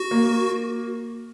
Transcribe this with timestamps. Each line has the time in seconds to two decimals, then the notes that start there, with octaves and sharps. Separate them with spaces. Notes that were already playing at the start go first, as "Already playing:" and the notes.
Already playing: F#4
0.11 A#3